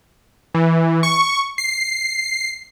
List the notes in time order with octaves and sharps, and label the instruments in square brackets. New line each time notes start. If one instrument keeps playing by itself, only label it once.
[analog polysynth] E3
C#6
C7